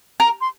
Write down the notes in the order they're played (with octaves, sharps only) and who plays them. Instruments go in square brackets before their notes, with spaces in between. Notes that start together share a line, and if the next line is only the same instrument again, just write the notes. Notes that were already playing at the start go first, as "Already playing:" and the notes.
[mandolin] A#4 [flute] A#5
[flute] C6